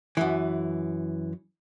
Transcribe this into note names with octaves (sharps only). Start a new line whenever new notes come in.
F#2 E3